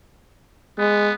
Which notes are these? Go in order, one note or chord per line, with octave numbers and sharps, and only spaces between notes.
G#3 B3